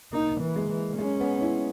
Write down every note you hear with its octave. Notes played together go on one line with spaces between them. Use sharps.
A#3 D#4
E3
G#3
E3
G#3 C#4
B3
E4